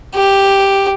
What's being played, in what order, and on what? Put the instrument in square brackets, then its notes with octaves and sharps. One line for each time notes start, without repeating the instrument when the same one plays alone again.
[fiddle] G4